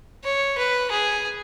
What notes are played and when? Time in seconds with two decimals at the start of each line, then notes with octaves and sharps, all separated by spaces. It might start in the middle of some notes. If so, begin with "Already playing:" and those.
0.24 C#5
0.58 B4
0.91 G#4